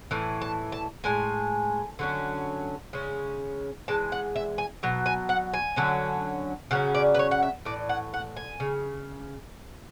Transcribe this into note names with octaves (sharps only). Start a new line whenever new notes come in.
A2 E3
A5
A5
A2 G#3 G#5
D3 F#3 C#4
C#3 G#3 C#4
E3 G#3 A5
F#5
E5
G#5
B2 F#3
G#5
F#5
G#5
D3 F#3 C#4
C#3 F#3 C#4 F#5
D5
B4
C#5
F#5
E5
A2 E3 D5
F#5
F#5
G#5
C#3